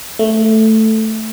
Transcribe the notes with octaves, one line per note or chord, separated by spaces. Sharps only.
A3